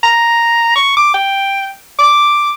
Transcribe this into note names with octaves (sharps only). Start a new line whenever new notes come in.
A#5
C#6
D6
G5
D6